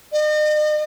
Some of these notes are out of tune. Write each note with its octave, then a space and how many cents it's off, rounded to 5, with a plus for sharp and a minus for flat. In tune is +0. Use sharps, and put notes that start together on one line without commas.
D#5 -40